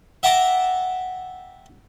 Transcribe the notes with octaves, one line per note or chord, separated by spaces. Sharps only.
E5 F#5 G5 A5 A#5 D6